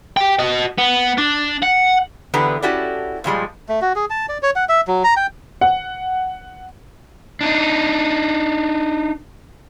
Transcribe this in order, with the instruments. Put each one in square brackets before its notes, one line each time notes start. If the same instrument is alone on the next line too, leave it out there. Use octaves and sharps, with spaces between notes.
[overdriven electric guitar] G4 G5
F#4 D#5
B3
D4
F#5
[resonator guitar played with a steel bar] E2 D3 B3 G4 B4 A#5
C#4 E4 F#4 G4 A4 D5
A#2 F3 G3 G#3
[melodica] A3
F#4
G#4
A5
D5
C#5
F#5
E5
F#3
A#5
G5
[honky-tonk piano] F#5
[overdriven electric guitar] D4 D#4